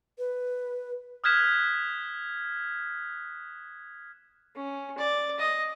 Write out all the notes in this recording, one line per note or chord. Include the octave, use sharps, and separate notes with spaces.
B4
D#6 F6 F#6 G#6 B6 E7
C#4
D5
D#5